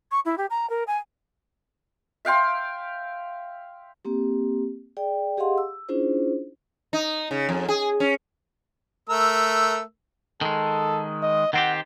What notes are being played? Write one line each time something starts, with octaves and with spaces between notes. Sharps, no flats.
C#6
E4
G4
A#5
A#4
G#5
E5 F5 G5 C6
A#3 C4 G4
G#4 D5 G5
G4 G#4 D#5 F5 F#5 C6
E6
C#4 D4 E4 F4 G#4 C5
D#4
C#3
F2
G#4
C#4
A3 A#4 E6
D#3 G#3 A4
D#5
D#3 C4 G4 F#5